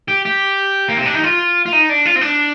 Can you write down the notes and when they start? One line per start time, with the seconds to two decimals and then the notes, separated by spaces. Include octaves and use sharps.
0.08 G4
0.25 G4
0.89 A#3
0.97 C4
1.06 D4
1.14 D#4
1.24 F4
1.66 F4
1.73 D#4
1.89 D4
2.05 F4
2.16 C4
2.21 D4